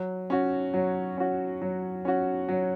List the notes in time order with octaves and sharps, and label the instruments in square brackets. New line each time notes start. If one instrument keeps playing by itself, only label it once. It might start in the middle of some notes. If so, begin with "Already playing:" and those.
Already playing: [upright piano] F#3
C#4 F#4
F#3
C#4 F#4
F#3
C#4 F#4
F#3